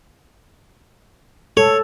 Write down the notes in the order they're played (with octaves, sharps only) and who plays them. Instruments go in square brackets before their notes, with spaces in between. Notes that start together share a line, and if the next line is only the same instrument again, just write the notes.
[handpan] A4 [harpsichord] C#5